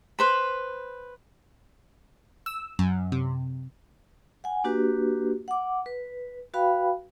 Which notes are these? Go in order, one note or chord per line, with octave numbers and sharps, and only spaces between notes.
B4 C5 B5
E6
F#2
C3
F#5 G#5
A#3 D4 F#4 G4 B4
F#5 D6
B4
F#4 B4 F5 G5 B5